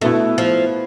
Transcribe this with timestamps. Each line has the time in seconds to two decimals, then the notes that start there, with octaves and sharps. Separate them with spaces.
0.01 B2 A3 B3 E4
0.38 F3